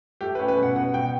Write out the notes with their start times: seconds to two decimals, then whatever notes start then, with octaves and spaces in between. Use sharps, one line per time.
0.21 A3 G4
0.35 B4
0.40 C#4
0.48 B4
0.57 B2
0.63 F#5
0.76 B2 F#5
0.94 B2 G5